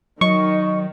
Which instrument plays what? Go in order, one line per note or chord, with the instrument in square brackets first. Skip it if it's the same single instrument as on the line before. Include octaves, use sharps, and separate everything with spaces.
[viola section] D#3 [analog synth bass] F#3 [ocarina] D#5 [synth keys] C#6